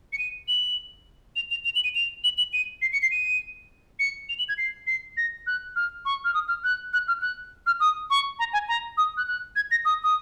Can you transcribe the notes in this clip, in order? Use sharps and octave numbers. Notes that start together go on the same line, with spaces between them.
C#7
D#7
F#7
F7
F7
F7
F#7
D#7
F7
F#7
F#7
D#7
C7
C#7
C7
D#7
C#7
F7
F#7
G#6
C7
C7
A#6
F#6
F6
C#6
F6
D#6
F6
F#6
F#6
F6
F#6
F6
D#6
C#6
A#5
G#5
A#5
D#6
F#6
F#6
G#6
A#6
D#6
D#6